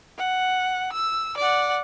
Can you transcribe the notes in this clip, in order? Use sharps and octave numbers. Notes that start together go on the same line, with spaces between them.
F#5
E6
D5 F#5